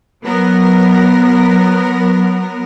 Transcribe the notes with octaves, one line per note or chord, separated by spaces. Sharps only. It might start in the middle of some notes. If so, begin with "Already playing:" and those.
F#3 B3 A#4